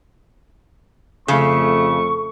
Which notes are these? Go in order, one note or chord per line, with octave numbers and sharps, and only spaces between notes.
F2 C#3 A3 C#6